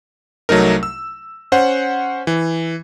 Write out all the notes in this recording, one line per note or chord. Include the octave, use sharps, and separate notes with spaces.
C2 F#3 A3 D#4 A#4
E6
C#4 C5 F#5
E3